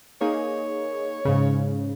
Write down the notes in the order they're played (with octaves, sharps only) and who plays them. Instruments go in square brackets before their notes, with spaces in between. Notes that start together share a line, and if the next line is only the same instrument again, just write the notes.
[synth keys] A#3 D#4 G#4 [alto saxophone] C#5
[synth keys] G#2 C#3